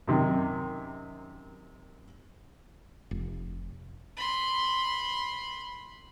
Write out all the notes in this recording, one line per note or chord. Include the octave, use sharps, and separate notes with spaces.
F#2 C3 D#3
F1
B5 C6